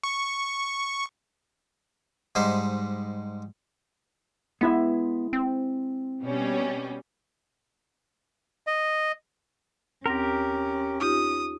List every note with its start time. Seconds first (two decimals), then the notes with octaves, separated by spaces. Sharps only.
0.04 C#6
2.35 G#2 G3 D#4 C5
4.61 G#3 B3 E4 E5
5.33 C4
6.22 B2 G3 C#4
8.67 D#5
10.06 D#2 C4 C#4 G4 A#4 A#6
11.00 D#4 F4 G4 D#6